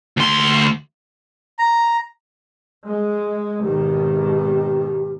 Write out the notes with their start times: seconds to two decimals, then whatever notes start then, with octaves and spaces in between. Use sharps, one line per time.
0.17 D2 C6
1.59 A#5
2.85 G#3
3.62 G#1 B2 D#3 G4